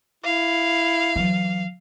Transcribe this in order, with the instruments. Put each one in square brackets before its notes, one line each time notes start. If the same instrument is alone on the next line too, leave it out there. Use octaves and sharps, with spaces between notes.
[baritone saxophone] E4 [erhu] F5
[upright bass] E3 F#3